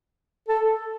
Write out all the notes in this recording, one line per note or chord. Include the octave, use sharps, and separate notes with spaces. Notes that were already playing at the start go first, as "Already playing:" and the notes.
A4